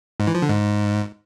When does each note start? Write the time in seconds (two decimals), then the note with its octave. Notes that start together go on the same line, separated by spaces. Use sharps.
0.20 G#2
0.27 E3
0.35 F3
0.42 D3
0.50 G#2